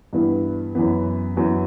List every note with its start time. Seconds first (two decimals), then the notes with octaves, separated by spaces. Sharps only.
0.13 G2 E3 B3 E4
0.75 F#2 E3 B3
1.36 F#2 E3 B3 F#4